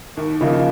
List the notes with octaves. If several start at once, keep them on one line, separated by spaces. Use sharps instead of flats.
D#2
C#3 F3 A#3 D#4